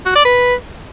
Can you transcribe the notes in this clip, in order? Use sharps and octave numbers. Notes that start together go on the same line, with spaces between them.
F#4
D5
B4